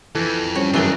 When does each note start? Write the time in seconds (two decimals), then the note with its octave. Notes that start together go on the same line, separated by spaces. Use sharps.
0.15 F2 E3 A4
0.55 G3 C4 C#4 C#5
0.74 F#1 F#2 D#3 E3 D4 D#4 G7